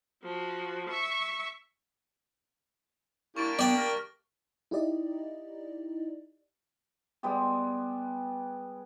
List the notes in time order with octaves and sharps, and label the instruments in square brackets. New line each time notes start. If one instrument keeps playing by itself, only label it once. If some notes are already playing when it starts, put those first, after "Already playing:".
[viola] F3 F#4
E5 C#6
[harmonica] A#3 D4 G4 [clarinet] E4 [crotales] C#6 A6 D7
[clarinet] B3 [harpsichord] D5 G5
[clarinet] A#4 [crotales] F6 A6
[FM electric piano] D#4 E4 G4 D5 D#5
[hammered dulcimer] G3 G#3 B3 G4